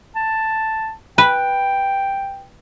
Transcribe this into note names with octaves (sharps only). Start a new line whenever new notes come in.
A5
B4 G5